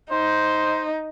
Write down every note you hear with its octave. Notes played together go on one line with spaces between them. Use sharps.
D#4 C5